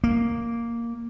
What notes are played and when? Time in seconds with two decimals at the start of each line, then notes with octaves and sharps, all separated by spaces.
0.04 A#3